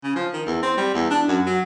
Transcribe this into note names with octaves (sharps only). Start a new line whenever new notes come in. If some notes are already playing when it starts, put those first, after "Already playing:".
C#3
F3
D#3
E2
C4
G3
E2
D4
F#2
F#3